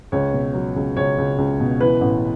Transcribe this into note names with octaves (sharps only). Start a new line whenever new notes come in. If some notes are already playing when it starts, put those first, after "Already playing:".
C#2 C#5
B2
F#3
C#2
C#2 C#5
C#2
C#2
B2
E3 B4
A1